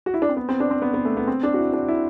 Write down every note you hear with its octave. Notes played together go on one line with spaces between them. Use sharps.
F#4
E4
D4
C4
B3
C4
D4
C4
B3
B3
A3
B3
C4
D4
F#4
E4
D4
E4